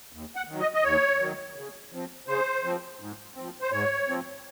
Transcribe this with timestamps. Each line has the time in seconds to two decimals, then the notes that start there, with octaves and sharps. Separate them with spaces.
0.12 D#2
0.36 F#5
0.48 D#3 F#3
0.60 D#5
0.74 D#5
0.84 D#2 C#5
1.20 D#3 F#3
1.56 C#3
1.92 F3 C4
2.27 C#3 C5
2.64 F3 C4
3.00 G#2
3.36 F3 C4
3.61 C5
3.72 G#2 C#5
4.08 F3 C4